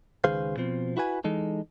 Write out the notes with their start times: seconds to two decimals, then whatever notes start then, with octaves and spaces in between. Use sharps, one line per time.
0.24 C#2 D#3 G#4 B4 C5 F5
0.57 B2 F3 C4
0.97 E4 F#4 B4 G#5
1.24 E3 G#3 D#4 A4